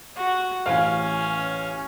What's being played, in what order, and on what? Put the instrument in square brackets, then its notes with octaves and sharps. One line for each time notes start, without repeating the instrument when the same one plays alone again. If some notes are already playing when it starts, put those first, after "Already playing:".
[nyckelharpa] F#4
[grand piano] A1 F5 [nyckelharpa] C#4